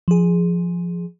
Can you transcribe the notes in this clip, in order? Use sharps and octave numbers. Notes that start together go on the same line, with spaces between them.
F3 G#4